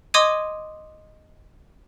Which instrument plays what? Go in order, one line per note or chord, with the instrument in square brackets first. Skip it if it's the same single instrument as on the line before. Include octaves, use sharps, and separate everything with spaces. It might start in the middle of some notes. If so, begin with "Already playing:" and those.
[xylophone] D#5 C6 D6 D#6 G#6 D#7